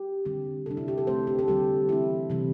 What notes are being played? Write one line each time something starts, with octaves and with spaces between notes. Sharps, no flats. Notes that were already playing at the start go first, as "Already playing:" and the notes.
Already playing: G4
D3 G3 C4
C3 G3 D4 A4
E4
G4
A4
D3 A3 C4 C5
G4
A4
D3 G3 C4 G4
E3 C4 E4
C3 E3 G3 C4